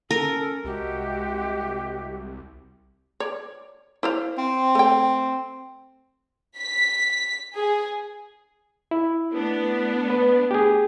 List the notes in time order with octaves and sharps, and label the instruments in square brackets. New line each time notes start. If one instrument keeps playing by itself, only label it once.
[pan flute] C#4 [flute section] A4 [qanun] A#4
[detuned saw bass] C2 [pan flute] G#3 [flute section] F#4 G4 E5
[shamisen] C#5 D5
E4 C5 F5
[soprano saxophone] C4
[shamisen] A3 G5
[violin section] B6
G#4
[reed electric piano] E4
[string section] A3 B3 D4
[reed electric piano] B4
G4 G#4